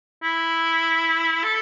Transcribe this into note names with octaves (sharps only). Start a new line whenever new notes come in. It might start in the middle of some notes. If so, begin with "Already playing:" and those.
E4
A4